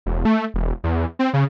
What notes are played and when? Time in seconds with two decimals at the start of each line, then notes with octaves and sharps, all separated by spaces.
0.06 E1
0.25 A3
0.54 E1
0.84 E2
1.19 C4
1.34 C#3